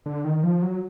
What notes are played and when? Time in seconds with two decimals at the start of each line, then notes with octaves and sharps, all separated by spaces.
0.06 D3
0.25 D#3
0.43 F3
0.62 F#3